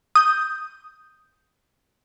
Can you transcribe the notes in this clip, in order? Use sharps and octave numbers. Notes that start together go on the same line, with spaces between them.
D#6 G6